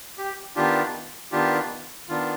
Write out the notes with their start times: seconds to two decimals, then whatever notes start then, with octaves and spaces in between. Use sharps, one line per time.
0.18 G4
0.56 D#3 B3 D4 F4 G4
1.32 D#3 B3 D4 F4 G4
2.09 D#3 B3 D4 F4